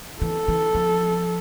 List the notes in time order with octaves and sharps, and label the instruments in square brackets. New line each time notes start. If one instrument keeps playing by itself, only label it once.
[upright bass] E3 [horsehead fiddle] A4
[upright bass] E3
F3